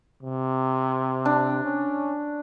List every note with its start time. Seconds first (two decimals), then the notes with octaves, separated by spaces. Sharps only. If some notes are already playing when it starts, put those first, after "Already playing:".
0.23 C3
1.25 D4
1.64 C#4